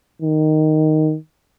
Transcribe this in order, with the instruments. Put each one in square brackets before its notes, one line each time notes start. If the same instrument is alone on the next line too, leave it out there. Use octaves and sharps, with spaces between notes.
[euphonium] D#3